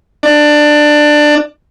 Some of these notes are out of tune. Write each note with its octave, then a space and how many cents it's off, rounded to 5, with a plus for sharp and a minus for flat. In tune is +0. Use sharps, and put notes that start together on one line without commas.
D4 +15